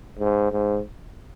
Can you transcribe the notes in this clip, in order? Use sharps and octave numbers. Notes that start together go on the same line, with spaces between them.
G#2
G#2